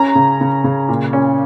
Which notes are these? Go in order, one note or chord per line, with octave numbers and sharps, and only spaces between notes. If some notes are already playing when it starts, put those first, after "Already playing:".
Already playing: C#4 A#5
C#3
C#3
C#3
A#2
C#4